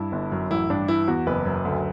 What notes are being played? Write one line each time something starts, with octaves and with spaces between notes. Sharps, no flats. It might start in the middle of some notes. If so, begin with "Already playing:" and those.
Already playing: G2 E4
G1
F#2
A1 E4
G2 D4
E3 E4
E2 F#4
F#1 B4
F#2
D2